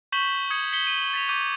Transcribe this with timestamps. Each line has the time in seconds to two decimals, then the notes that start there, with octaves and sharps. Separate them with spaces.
0.12 C#6 G6 B6 E7 F#7 G7
0.50 D#6 G#6 C#7
0.73 B6 C#7 G7
0.87 D#7
1.13 A6 B6 F7
1.29 D6 G6 D#7